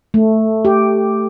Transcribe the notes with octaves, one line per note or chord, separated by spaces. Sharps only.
A3
G4